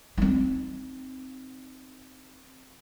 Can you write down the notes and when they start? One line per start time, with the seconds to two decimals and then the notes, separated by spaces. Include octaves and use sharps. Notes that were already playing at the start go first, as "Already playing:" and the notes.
0.18 C4 D#4